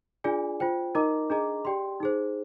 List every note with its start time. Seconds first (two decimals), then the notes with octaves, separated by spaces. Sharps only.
0.24 D4 F4 G#4 D5 G#5
0.60 F4 C5 G5
0.95 D#4 A#4 D#5 A#5 D6
1.30 D4 G#4 D#5 A#5 D6
1.65 G4 D5 G5 C6
2.00 D#4 G#4 C5